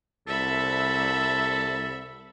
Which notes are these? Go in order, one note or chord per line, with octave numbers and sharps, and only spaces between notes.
C2 A4 E5 B5